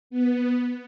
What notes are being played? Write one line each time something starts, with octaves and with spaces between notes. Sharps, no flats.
B3